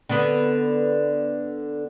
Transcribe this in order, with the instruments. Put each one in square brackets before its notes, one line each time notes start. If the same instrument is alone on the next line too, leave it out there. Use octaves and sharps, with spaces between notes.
[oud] D3 B3 B4